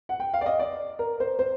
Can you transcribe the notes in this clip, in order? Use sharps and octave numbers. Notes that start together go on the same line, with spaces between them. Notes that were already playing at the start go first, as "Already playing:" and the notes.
F#5
G5
F5
D5
D#5
D5
A#4
C5
C5